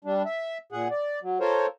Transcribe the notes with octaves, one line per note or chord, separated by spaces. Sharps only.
G3 D4
E5
A#2 G#4 F#5
D5
F#3
F4 A4 A#4 C5 C#5